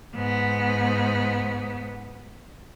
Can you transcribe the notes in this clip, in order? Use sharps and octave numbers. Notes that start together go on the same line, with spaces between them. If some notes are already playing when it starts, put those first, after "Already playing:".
G#2 B3